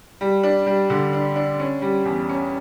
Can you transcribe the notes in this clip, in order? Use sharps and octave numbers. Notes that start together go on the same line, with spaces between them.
G3
D4
G3
D3
D4
D4
C#4
G3
E2
C#4